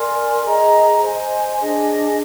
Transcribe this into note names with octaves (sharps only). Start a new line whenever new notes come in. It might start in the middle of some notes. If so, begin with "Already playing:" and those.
Already playing: A#4 D5 G#5 C6
G#4 D#5 A#5
C5 D#5 G#5
D4 G#4 D#5 G#5